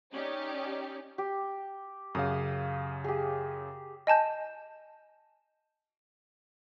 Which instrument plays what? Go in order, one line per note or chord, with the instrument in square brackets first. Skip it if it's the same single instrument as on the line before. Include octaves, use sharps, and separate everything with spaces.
[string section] C#4 D#4 G4 D5
[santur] G4
[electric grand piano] F#2 C#3 F5 [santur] D#6
[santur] G4 G#4
[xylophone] D#5 G#5 A5 G6